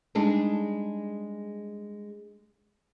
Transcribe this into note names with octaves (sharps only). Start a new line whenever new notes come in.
G3 G#3 D4 D#4 G#4